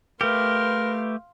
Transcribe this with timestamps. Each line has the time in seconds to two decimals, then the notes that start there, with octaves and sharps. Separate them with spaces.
0.21 A3 G4 A#4 B4 F5 C6